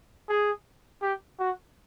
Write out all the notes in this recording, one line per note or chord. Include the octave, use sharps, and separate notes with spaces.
G#4
G4
F#4